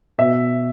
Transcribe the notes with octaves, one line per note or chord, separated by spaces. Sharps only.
B2 E5